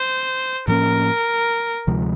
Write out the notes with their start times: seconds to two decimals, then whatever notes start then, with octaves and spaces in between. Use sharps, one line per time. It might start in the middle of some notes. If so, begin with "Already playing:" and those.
Already playing: C5
0.67 A2 F3 A#3 C#4 A#4
1.87 D2 C3 F3 G#3